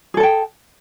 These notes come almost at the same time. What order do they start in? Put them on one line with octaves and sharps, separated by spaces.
G#4 A4 A5 G5